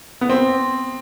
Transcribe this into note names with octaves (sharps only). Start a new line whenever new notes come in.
B3
C4